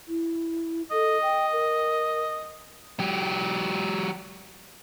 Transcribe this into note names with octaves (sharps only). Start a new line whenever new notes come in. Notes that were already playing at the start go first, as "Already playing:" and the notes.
E4
A4 D#5
G5
A#4
F#3 G4